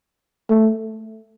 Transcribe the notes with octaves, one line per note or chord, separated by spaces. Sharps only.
A3